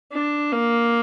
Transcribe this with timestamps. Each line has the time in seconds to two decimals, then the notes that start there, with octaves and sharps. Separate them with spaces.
0.12 D4
0.52 A#3